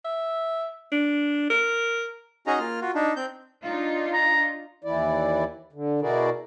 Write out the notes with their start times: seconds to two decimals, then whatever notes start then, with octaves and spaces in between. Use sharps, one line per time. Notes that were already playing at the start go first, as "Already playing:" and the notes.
0.05 E5
0.92 D4
1.50 A#4
2.47 C#4 D#4 F#4 G#4 D#5 A#5
2.59 A#3 F4 F6
2.81 F4 F#4
2.95 D4 D#4
3.16 C4 G6
3.64 D4 D#4 F4
4.13 A#5
4.84 D#2 E3 E4 D5
5.73 D3
6.01 B2 E4 F#4 G#4 A#4 D5